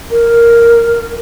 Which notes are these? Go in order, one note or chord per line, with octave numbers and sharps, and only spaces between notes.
A#4